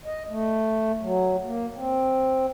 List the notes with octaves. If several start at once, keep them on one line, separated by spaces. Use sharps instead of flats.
D#5
A3
F#3
A#3
C4